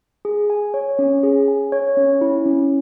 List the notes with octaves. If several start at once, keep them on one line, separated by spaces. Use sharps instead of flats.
G#4
G#5
C#5
C#4
G#4
G#5
C#5
C#4
E4
C#4